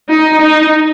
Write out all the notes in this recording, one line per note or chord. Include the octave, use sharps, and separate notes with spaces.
D#4
D#4